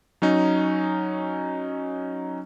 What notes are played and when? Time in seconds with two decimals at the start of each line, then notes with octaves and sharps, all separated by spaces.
0.22 F#3 C#4 D#4